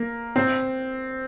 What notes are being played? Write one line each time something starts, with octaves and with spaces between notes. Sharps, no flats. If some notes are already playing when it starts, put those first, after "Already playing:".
Already playing: A#3
C4